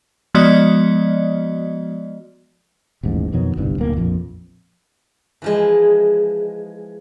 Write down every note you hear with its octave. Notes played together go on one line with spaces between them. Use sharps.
F3 G#3 B3 F#4 D5 D#5
D#1 A1 G#2
F2 B2 D#3 F#3
G1 C2 G2
D1 B1 A#3
A#1 F2
E3 F3 G#3